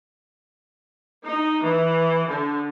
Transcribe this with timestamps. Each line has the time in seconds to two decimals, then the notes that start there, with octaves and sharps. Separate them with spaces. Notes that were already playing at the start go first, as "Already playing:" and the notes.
1.24 D#4
1.64 E3
2.28 D3